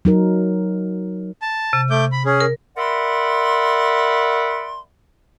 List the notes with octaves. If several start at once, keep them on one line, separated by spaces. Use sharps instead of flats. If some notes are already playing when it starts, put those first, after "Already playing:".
F#3 D#4 A#4
A5
C3
A3 D6 G6
B5
C#4 G#4
A#4
A#4 D5 E5 F#5 B5 C6